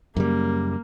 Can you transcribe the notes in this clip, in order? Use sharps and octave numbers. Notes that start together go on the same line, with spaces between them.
F#2 C#3 G3 A#3